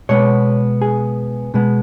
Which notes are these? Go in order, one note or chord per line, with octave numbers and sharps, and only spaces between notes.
B2 G#3 B3 C#5
G#4
B2 G#3 B3